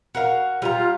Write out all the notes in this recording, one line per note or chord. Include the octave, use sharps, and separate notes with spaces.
F#4 A#4 F5
G3 F4 G#5 A#5